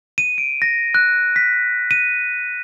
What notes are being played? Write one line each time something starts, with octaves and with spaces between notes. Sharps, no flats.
D#7
D7
A#6
F#6
B6
D#7